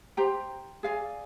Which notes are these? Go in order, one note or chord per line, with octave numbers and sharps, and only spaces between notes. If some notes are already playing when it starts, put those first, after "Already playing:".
G4 C5 G5 A#5
G#4 D5 F5 G#5